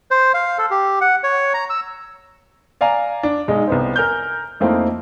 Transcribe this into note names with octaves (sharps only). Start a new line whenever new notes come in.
C5
F5
A4
G4
F#5
C#5
A#5
E6
D5 F5 G#5 A#5
D4
B1 G#3 D#4
C2 B3 C5
A#4 G#5 F6 G6
F2 A3 A#3 C4 D#4 E4